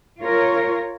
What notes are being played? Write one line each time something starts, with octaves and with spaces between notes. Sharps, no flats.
F4 A#4 C#5